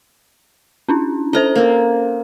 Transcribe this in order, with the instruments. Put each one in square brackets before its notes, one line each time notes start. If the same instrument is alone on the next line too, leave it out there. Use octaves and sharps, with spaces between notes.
[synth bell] C#4 D4 E4
[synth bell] C#4 A4 C5 [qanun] D#5 A#5
[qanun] A#3 C4